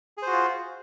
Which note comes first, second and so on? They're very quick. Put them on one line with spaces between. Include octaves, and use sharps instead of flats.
G#4 C5 F#4 F4